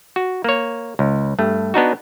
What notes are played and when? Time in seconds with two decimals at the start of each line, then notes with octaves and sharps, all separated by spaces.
0.16 F#4
0.44 A#3 C#5
0.99 C#2
1.39 G2 A3
1.74 B3 D4 D#4 F#4